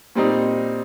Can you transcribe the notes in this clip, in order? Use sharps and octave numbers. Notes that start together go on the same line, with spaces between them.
A#2 G3 C4 D#4